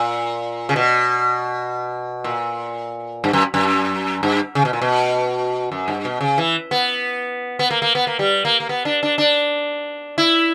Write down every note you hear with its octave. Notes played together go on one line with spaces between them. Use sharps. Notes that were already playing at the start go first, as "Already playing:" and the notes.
Already playing: A#2
C#3
B2
A#2
G2
F#2
F#2
G2
C#3
B2
A#2
B2
F#2
G2
B2
C#3
E3
B3
B3
A#3
A#3
B3
A#3
G3
A#3
A#3
B3
D4
D4
D4
E4